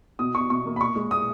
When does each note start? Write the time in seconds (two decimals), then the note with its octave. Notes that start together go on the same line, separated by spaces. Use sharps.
0.19 B2 D#6
0.34 B2 C#6
0.50 B2 C#6
0.66 A#3
0.76 B5
0.81 A#2 C#6
0.96 G#3
1.11 A#2 D#6